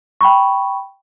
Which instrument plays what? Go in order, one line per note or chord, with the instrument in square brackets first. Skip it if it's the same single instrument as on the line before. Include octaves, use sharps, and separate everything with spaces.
[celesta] G5 B5 C#6